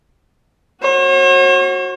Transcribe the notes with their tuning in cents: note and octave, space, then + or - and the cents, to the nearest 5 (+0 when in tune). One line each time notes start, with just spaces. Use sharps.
F#4 +0 C#5 -45